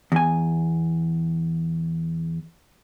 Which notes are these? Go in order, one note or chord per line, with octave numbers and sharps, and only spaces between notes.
E2 G#5